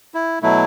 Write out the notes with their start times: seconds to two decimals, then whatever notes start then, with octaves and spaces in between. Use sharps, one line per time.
0.14 E4
0.42 B2 F#3 A3 E4